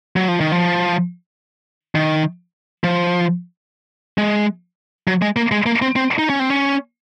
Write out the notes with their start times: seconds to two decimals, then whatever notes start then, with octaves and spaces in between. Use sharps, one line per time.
0.16 F#3
0.28 F3
0.40 D#3
0.52 F3
1.95 D#3
2.84 F3
4.18 G#3
5.08 F#3
5.22 G#3
5.36 A#3
5.52 G#3
5.66 A#3
5.82 C4
5.96 C4
6.19 D#4
6.30 C#4
6.39 C4
6.50 C#4